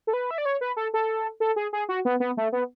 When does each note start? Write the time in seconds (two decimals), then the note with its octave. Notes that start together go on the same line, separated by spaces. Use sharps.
0.07 A4
0.13 B4
0.31 E5
0.38 D5
0.46 C#5
0.61 B4
0.77 A4
0.94 A4
1.40 A4
1.56 G#4
1.73 G#4
1.89 F#4
2.05 B3
2.20 B3
2.37 A3
2.52 B3